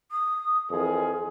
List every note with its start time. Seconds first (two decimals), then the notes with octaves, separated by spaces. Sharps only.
0.11 D#6
0.71 F2 E3 G#4 A#4